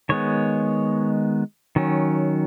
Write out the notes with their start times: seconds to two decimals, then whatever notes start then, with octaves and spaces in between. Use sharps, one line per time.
0.09 D#3 G#3 B3 C#5
1.76 D#3 F#3 C#4